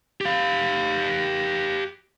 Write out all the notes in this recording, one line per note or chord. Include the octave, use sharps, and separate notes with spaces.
G4 F5